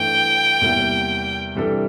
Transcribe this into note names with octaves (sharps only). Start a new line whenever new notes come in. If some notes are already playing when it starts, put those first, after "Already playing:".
Already playing: G2 E3 A3 G5
E2 C3 G3 A#3 E4
C3 E3 G3 D4 A4